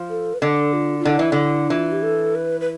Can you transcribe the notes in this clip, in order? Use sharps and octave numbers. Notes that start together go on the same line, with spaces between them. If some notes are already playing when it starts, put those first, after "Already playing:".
Already playing: F3
A4
B4
D3 A4
F4
F4
D3 E4
E3
D3
E3 F4
G4
A4
B4
B4